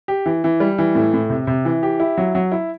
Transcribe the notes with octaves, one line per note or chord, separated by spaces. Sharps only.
G4
E3
E3
G3
E3
A2
A2
C3
C3
E3
G4
E4
F#3
F#3
E4